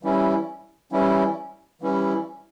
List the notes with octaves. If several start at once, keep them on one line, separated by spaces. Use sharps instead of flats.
E3 G3 C#4 E4
E3 G3 C#4 E4
E3 G3 C#4 E4